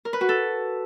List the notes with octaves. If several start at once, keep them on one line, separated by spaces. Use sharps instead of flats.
A#4
B4
F#4
A4